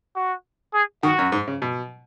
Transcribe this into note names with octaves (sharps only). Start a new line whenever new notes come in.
F#4
G#4
D#3 F#4
F#2
G#2
C#3
B2